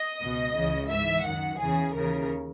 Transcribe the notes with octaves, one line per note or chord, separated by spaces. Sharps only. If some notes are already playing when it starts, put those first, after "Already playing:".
Already playing: D#5
C#2 B2
C#2 C#3 E3
G#2 E3 E5
F#2 D#3 F#5
E2 C#3 E3 G#4
D#2 C#3 E3 A#4